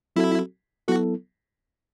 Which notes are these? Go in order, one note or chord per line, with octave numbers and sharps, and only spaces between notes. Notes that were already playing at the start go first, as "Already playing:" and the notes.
F#3 C4 E4 F#4 A4
F#3 B3 E4 F#4 A4